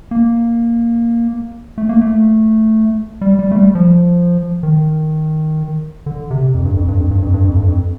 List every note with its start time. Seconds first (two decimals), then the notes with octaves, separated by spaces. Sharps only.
0.11 A#3
1.78 A3
1.89 A#3
2.01 A3
3.21 G3
3.39 G3
3.52 A3
3.56 G3
3.75 F3
4.63 D#3
6.06 D3
6.31 C3
6.55 F2
6.65 G2
6.77 F2
6.88 G2
7.00 F2
7.11 G2
7.22 F2
7.34 G2
7.45 F2
7.56 G2
7.67 F2